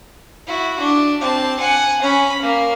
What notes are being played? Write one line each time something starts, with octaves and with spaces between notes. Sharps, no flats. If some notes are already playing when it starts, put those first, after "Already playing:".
E4 F#4
D4
C4 A5
F#5 G#5
C#4 B5
A#3